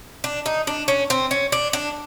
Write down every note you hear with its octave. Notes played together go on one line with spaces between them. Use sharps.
D4
D#4
D4
C#4
C4
C#4
D4
D4